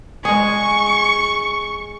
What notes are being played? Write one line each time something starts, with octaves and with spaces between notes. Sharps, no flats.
G#3 G#4 C#6